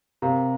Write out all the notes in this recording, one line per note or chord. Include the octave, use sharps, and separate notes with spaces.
C3 G4 A#4 F5 A#5